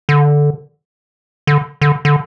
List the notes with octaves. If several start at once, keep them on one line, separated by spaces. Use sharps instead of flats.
D3
D3
D3
D3